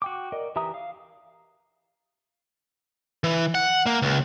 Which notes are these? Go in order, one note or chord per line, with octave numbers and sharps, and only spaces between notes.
F#4 G5 D6
A#4 D5 D#5
E3 G4 E5 A#5 D#6
F5
E3
F#5
A#3
C#2